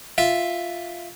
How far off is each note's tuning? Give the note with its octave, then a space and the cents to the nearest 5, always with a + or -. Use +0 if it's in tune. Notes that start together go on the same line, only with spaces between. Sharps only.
F4 +0 E5 +0